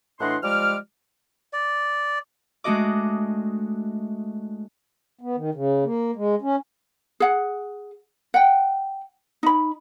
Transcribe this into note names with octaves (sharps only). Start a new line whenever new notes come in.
A2 E3 D4 D#5 F#5 C6
F3 G3 G#3 D6 F6
D5
G#3 A3 D4 F#4 D#5 D6
B3
D#3
C#3
A#3
G#3
C#4
G#4 F#5
F#5 G5
D#4 B5